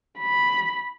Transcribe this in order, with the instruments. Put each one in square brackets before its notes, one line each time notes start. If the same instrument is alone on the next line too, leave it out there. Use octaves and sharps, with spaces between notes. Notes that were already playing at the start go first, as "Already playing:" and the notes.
[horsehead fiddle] B5